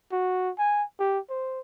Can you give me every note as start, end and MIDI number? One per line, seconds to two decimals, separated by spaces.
0.12 0.50 66
0.58 0.83 80
1.00 1.19 67
1.30 1.60 72